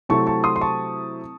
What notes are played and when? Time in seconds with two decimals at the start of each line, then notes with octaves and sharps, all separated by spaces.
0.09 C3 F#3 A3 C4 E4 A5 C#6
0.27 A5 C#6
0.44 C6 D#6
0.56 C6
0.61 A5 C#6